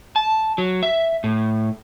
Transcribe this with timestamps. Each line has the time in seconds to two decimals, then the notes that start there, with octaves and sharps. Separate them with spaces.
0.16 A5
0.58 F#3
0.83 E5
1.24 A2